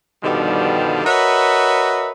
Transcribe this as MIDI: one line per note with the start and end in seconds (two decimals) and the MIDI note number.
0.24 1.04 43
0.24 1.04 47
0.24 1.04 50
0.24 1.04 51
0.24 1.04 53
0.24 1.04 55
1.05 2.12 66
1.05 2.12 70
1.05 2.12 71
1.05 2.12 73
1.05 2.12 75
1.05 2.12 76